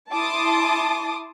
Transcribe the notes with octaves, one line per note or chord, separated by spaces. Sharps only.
E4 A5 C6 D6 D#6